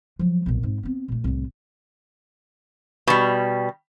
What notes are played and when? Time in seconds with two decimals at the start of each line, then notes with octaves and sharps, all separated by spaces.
0.19 F3 F#3
0.46 B1 A#2
0.63 G#2 C4
0.83 B3 C4
1.08 A#2 A3
1.24 C2 A2
3.07 B2 G3